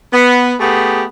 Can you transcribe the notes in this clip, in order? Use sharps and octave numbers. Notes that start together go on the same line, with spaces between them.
B3
A3 B3 G4 G#4